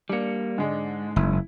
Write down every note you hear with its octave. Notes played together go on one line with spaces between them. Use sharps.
G3 A#3 D4 C#7
G#2 D3 G#3 D4
F#1 E4